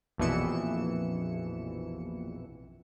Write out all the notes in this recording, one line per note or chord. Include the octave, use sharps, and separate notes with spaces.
A#1 F2 B2 E3 C#7 E7